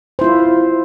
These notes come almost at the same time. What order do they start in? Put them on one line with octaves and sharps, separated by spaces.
C5 E4 F4